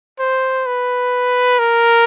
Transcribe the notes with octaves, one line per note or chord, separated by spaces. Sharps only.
C5
B4
A#4